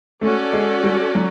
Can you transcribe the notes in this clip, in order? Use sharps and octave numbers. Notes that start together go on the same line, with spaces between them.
A3 C#4 F#4 A4 D5
G#3
G3
F#3